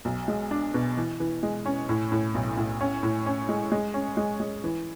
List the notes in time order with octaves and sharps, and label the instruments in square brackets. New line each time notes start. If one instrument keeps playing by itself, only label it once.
[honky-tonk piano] B1
G#3
D4
B2
E3
E3
G#3
C#4
A2
A2
B1
A2
C#4
A2
C#4
G#3
G#3
C#4
G#3
G#3
E3